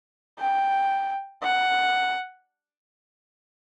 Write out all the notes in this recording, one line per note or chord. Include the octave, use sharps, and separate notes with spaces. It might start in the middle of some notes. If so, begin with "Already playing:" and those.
G5
F#5